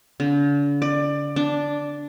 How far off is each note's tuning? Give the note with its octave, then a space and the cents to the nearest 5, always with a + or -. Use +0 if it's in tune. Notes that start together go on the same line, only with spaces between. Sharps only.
D3 -40
D5 +20
D4 -5